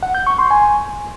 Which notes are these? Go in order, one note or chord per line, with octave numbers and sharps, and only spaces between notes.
F#5
G6
C#6
C6
G#5